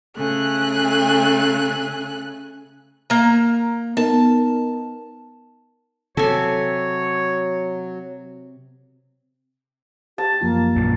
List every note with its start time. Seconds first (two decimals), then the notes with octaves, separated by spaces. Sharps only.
0.17 C#3 A3 G#5 F#6
3.10 A#3 A#5
3.97 B3 D#4 A#4 A5
6.17 C3 F#3 A4 C#5 G#5
10.18 G4 A5
10.41 F#2 F3 A#3 F4
10.76 A#1 F#2 A#2